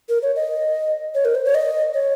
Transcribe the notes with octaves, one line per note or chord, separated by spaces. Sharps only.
A#4
C#5
D#5
C#5
A#4
C5
C#5
D#5
C#5